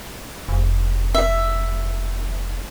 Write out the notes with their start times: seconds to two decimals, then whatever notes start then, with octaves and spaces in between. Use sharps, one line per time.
0.49 F1
1.15 E5